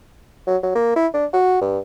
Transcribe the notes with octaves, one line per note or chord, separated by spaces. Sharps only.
F#3
F#3
A#3
E4
D4
F#4
G2